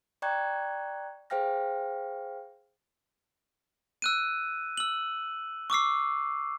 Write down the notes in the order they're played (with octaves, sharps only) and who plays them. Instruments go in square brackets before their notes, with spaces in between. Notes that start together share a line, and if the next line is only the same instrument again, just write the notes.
[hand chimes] D5 G5 A#5 C#6 F#6 G#6
G#4 C5 F5 G5 F6 A#6
[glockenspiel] E6 F#6 D#7
E6 F#7
C#6 D6 E6 C7